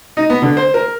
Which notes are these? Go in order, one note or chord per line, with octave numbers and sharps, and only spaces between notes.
D#4
B3
D3
C5
A#4